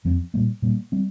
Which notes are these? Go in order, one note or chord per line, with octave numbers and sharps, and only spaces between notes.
F2 F3 C4
A#2 G3 A#3
A#2 G3 A#3
G3 C4